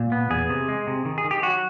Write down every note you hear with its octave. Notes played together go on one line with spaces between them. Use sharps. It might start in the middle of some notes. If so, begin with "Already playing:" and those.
Already playing: A#2
B3
E2 G#4
C3
G#3
C3
D#3
G#4
D#3
G4
F#3 F#4